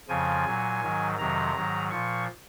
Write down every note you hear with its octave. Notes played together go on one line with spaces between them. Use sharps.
F2 C#3 F3 G#5
A#2 F#3
G#2 D#3 F#3
F2 C3 D#3 F#3 A#5
G#2 D#3 F#3
A#2 F3 C#6